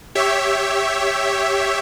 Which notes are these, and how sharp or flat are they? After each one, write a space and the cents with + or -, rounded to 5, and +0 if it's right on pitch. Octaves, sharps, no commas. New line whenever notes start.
G4 +0 C#5 +0 E5 +0